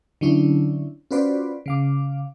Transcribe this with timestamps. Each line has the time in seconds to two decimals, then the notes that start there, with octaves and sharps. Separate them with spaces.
0.21 D3 F#3 C#4 D4 E4
1.11 C#4 F4 F#4 B4 C5 D5
1.66 C#3 F5 D6